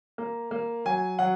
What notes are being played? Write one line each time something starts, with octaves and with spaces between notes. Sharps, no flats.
A#3
A#3
F#3 G#5
F#3 F#5